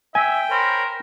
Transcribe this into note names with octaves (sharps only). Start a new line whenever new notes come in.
E5 G5 G#5
A#4 C5 C#5 B5